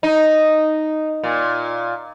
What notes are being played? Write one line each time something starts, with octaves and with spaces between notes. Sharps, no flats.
D#4
A#2